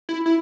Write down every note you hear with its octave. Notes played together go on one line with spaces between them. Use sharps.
E4
E4